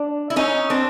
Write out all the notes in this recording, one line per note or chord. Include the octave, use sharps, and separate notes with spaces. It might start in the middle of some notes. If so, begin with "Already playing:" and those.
Already playing: D4
E4
C#4 D#4
C4 D4